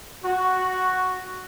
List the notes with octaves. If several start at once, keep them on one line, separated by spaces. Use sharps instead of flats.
F#4